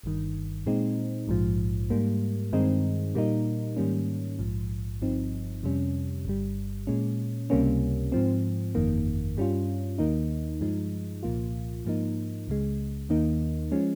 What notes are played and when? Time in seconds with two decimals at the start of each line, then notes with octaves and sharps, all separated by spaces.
0.03 G1 G2 D#3
0.66 A#2 G#3 C4 D#4
1.28 A#1 G#2 F3
1.90 G#2 G3 A#3
2.53 G2 D#3 G#3 C4 D#4
3.15 A#2 G3 A#3 D#4
3.77 G#2 D#3 G3 A#3 C#4
4.39 A#1 G#2 F3
5.01 G1 G2 F3 C4 D#4
5.63 F2 C3 G3 C#4
6.25 G1 G2 G3
6.87 A#2 G#3 C#4
7.50 C#2 C3 G3 A#3 C#4
8.12 G#2 F3 C4
8.75 G1 F2 D#3 A#3
9.37 G2 G3 C#4 F4
9.98 D#2 D#3 A#3 D#4
10.61 G2 F3 G#3 D#4
11.23 C2 A#2 F3 A#3 F4
11.85 G#2 F3 A#3 D#4
12.48 C#2 C#3 G#3
13.09 D#2 D#3 A#3 D#4
13.72 F3 G#3 C#4